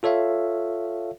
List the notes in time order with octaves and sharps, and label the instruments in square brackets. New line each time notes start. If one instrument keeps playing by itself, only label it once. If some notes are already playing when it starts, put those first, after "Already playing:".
[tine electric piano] F4 A4 C#5 E5 F5